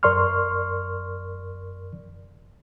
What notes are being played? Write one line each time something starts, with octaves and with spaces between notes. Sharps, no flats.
F#2 A#4 D5 C6 C#6 F6